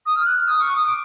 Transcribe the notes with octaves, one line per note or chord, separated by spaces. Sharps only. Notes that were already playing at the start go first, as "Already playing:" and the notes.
D#6
F6
F#6
F6
D#6
C#6
D#6
D6